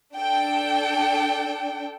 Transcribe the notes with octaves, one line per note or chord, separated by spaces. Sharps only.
D4 A4 G5